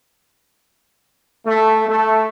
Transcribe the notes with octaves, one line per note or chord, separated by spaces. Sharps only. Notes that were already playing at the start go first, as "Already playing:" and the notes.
A3
A3